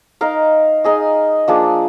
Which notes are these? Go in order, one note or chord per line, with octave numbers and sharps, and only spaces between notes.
D#4 A#4 F5
D#4 G#4 D#5
F3 A#3 D4 G#4